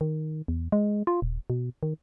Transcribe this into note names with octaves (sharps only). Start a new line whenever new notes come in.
D#3
E2
G#3
F4
D#1
B2
D#3